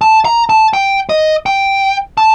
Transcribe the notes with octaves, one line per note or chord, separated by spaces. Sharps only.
A5
A#5
A5
G5
D#5
G5
A5